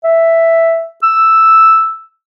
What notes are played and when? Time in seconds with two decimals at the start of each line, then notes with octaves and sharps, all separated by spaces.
0.04 E5
1.03 E6